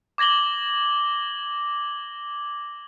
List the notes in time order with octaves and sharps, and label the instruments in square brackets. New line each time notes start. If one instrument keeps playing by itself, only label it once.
[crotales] D6 G#6 A#6 F#7 G7